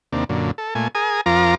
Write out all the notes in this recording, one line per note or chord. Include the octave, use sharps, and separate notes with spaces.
D#2 C3 A#3 D4
F#2 A#2 D3
A4
A#2 A3 G#5
G#4 A#4 G#5 D#6
F2 F3 F4 A#4 A#5 D6